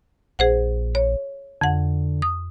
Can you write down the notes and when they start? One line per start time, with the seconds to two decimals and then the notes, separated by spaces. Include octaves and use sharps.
0.39 A#1 G#4 C5 F#5
0.95 C#5
1.61 F2 D3 F#5
2.22 D#6